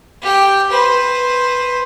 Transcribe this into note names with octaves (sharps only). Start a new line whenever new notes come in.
G4 G5
B4 C5